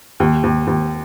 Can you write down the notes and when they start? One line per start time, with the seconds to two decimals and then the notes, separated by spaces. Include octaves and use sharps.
0.20 D#2
0.43 D#2
0.67 D#2